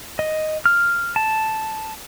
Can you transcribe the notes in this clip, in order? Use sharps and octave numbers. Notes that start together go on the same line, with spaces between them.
D#5
F6
A5